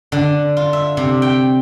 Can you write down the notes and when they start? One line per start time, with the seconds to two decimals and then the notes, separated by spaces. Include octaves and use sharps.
0.12 D3
0.57 F4
0.73 E5
0.97 C3
1.22 G5